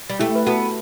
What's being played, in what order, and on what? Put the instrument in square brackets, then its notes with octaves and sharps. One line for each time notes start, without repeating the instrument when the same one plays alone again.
[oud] G3
[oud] A3 [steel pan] E4 G4
[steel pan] B4
[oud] B3 [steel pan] F#4 A4